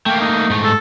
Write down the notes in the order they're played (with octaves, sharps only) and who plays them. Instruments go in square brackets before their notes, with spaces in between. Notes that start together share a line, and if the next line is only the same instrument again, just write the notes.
[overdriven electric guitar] A3 A#3 [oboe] G5
[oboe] D#4
[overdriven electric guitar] G#2 A3
[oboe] A4